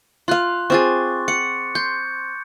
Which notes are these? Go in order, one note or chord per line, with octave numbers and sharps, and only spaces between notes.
F4 F5 C6 F#6
C4 F4 G#4 C#6 D6 A6
F#5 C#7
C6 G6